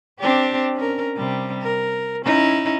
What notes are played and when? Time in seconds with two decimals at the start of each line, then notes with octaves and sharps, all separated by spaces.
0.20 C4 D4 G4
0.75 C#4 A#4
1.16 C3 G3
1.62 A#4
2.24 C#4 D#4 E4